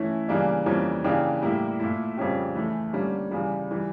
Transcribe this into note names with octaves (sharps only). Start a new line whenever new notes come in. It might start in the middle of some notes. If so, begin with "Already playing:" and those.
Already playing: E3 A3 C#4 E4
C#3 E3 G3 A#3 D4
F2 E3 G3 A#3 C#4
C#3 E3 A#3 D4 G4
A2 G3 A#3 E4 G4
A#2 A3 E4
F2 C#3 G3 C#4 G4
E2 E3 A3 E4
D3 G3 A#3 C#4
E2 C#3 G3
E3 G3